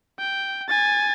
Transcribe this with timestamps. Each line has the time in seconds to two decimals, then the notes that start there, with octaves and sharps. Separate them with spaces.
0.19 G5
0.69 G#5 A6